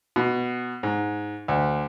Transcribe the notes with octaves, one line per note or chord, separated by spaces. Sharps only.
B2
G#2
D2